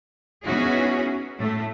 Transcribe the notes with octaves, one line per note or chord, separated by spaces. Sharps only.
B3 C#4 D#4 E4 F#4 G#4
A2 A3